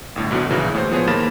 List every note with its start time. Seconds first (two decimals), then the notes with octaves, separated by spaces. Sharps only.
0.16 G1 A2 D3
0.31 B1 F#2 B2 D3 F#3
0.50 A#1 F#2 C#3 E3 F#3
0.74 A2 C5
0.91 F3 B3 G#4 C5 C#5
1.07 D#2 A#3 A#4 B5 A6 E7